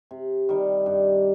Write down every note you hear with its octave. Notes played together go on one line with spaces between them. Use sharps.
C3
D#3 G3
G2